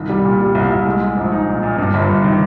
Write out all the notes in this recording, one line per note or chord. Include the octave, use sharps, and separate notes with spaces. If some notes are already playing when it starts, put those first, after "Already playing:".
Already playing: C2 D#3
G3
A#2
G3
C2
C2
G#3
G#3
A#1
D#4
A#2
A#2
G2
G1
G1
D#3